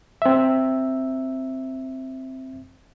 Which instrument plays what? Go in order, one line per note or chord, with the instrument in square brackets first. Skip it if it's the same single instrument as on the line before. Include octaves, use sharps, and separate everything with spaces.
[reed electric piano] C4 E5